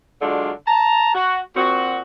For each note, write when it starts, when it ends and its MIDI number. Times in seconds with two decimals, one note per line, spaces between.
0.22 0.51 50
0.22 0.51 54
0.22 0.51 56
0.22 0.51 62
0.22 0.51 65
0.67 1.13 81
0.67 1.13 82
1.14 1.39 66
1.56 2.00 46
1.56 2.00 60
1.56 2.00 66